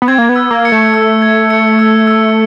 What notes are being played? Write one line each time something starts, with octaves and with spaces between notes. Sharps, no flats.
B3
C4 G#6
A#3
B3
E6
A#3
C#7
A3
E6
G#6
C#7
E6
E6